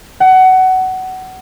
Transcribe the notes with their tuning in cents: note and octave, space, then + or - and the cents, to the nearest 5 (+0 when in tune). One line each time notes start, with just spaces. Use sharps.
F#5 +20